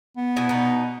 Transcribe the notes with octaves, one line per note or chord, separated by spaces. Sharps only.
B3
B2 E4 G#5
B2 D#4